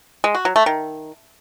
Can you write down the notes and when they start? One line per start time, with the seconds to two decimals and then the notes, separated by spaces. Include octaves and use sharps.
0.24 G#3
0.35 F#4
0.45 F#3
0.56 A3
0.66 D#3